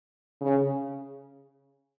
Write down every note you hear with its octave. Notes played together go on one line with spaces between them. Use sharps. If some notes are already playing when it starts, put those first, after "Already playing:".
C#3